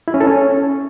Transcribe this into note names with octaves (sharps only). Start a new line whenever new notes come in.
E4
C#4
A4
C#4